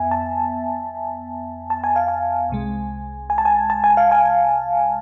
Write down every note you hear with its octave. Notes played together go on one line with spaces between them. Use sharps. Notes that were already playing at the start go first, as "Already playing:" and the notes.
Already playing: F2 B3 E5 G#5
A5
A5
G#5
F5
G#5
C2 C3 G#3
G#5
A5
G#5
A5
G#5
F5
G#5